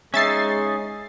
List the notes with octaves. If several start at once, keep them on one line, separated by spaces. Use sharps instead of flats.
G#3 C#4 D#4 E5 A6 C7